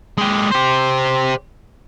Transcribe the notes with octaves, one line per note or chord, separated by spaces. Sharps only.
G#3 G4
G4 C5